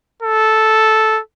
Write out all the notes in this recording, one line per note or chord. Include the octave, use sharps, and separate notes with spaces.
A4